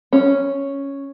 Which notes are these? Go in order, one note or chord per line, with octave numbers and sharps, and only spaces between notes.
C#4